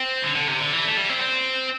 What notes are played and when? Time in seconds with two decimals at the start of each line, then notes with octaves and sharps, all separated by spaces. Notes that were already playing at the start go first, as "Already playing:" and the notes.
Already playing: C4
0.23 D3
0.36 D3
0.48 C3
0.60 D3
0.73 E3
0.85 A3
0.97 G3
1.10 C4
1.21 C4